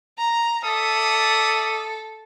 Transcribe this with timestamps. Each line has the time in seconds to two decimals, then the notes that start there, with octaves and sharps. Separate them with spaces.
0.18 A#5
0.64 A4 D5 E5 D#6